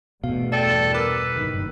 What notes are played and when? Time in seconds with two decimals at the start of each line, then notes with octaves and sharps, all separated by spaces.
0.24 E2 G2 B2 A3 F5
0.52 A4 D5 G5
0.94 A#4 B4 D6 E6
1.34 F#1 G2 D#3